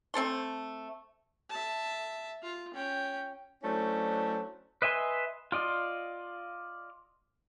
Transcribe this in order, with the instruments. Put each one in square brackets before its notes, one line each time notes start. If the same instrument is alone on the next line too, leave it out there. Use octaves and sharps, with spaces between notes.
[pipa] A3 C4 A4 C6
[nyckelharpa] E5 A5
F4
C#4 G5
[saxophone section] F#3 A3 C#4 D4 E4 C5
[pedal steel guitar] B4 D#5 E5 G#5 C6
F4 D5 D#5